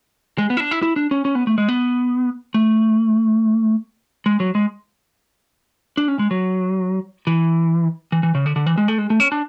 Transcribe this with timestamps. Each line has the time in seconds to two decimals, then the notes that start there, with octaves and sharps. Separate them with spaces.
0.38 G#3
0.50 B3
0.57 E4
0.60 D4
0.71 E4
0.83 E4
0.96 D4
1.11 C#4
1.25 C#4
1.35 B3
1.47 A3
1.58 G#3
1.69 B3
2.54 A3
4.26 G#3
4.40 F#3
4.55 G#3
5.97 D4
6.08 C#4
6.19 G#3
6.31 F#3
7.27 E3
8.12 E3
8.23 E3
8.35 C#3
8.46 D3
8.56 D3
8.66 E3
8.78 G#3
8.88 A3
8.98 G#3
9.10 A3
9.20 C#4
9.32 D4